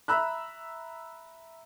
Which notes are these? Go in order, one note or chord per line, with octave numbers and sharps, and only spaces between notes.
E5 A#5 B5 E6 F#6